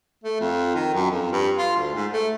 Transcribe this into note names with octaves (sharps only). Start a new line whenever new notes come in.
A3
F2
D#3
F#2
F2
G2
F4
D2
G#2
A3